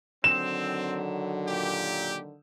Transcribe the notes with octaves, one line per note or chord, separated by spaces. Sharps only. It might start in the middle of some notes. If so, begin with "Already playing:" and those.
D3 D#3 F#3 C4 E7
A#2 G4